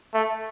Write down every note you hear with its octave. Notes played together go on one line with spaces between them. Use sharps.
A3